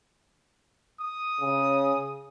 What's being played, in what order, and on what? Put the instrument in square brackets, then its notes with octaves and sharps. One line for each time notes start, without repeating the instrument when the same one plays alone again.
[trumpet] D#6
[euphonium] C#3